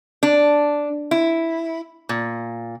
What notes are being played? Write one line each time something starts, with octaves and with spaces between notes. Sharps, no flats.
D4
E4
A#2